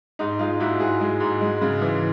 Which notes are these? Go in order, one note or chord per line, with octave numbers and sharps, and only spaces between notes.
G#2 D#4
G#3 D#4 F4
G#2 E4 F#4
G#2 F#4 G#4
G#3
G#2
G#3
C#3
E3